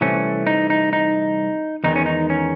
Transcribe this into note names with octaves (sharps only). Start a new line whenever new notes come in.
C2 C3 E3 A3 C#4
D#4
D#4
D#4
E2 D#3 G#3 D#4
C#4
D#4
C#4